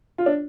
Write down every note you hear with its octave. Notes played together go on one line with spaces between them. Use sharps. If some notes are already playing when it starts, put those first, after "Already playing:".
F4
D4